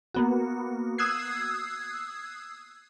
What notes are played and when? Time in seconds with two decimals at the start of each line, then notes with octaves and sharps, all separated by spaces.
0.14 A#3 B3 F#4
0.98 D#6 E6 F#6 G#6 C7